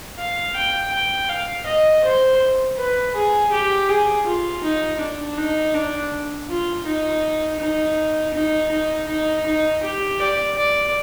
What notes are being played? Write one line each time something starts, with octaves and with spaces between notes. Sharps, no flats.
F5
G5
G5
F5
D#5
C5
B4
G#4
G4
G#4
F4
D#4
D4
D#4
D4
F4
D#4
D#4
D#4
D#4
D#4
D#4
G4
D5
D5